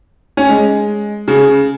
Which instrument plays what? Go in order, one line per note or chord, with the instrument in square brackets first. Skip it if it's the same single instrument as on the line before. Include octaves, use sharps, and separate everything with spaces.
[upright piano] C#4
G#3
C#3